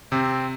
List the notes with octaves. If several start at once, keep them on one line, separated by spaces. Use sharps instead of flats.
C3 C4